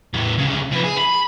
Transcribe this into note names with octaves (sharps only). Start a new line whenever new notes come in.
E2 A2
D2 C#3
F3 B4
G#4
B5